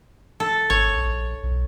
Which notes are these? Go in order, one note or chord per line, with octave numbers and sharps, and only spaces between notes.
A4
G#1 C#5
A#1
B1